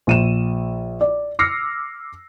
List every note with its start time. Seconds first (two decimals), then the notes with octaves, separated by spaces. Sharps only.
0.07 A#1 D#7 E7
1.01 D5
1.39 D6 E6 F6 A#6 C7 C#7